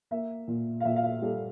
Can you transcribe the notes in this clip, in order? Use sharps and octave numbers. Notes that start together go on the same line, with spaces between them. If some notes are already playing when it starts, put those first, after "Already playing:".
A#3 E5
A#2
F5
A#2 E5
F5
E5
G3 A4